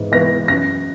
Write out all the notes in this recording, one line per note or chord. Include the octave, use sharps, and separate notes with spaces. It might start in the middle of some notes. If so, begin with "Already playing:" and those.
Already playing: G#2 E3 B3
E3 B3 A#6
F#2 A#6